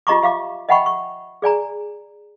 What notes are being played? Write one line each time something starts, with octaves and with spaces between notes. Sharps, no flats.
F4 G4 D#5 A#5 C#6 D6
G4 E5 F5 D6
D#5 E5 F#5 G5 B5 C#6
C#6
G#4 D5 G#5 A#5